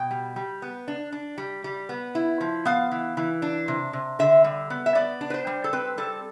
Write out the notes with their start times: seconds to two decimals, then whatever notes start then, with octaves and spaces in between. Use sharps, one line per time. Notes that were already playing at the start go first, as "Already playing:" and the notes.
Already playing: B2 G5
0.11 G3
0.36 G3
0.62 B3
0.88 D4
1.12 D4
1.38 G3
1.64 G3
1.89 B3
2.15 E4
2.41 F3
2.65 B3 F5
2.92 E3
3.17 E3
3.42 D4
3.68 C3
3.93 C3
4.19 D3 E5
4.44 G3
4.70 B3
4.86 E5
4.95 B3 D5
5.21 D4
5.30 B4
5.34 C5
5.47 G3
5.64 A4
5.73 C4 B4
5.98 G3 A4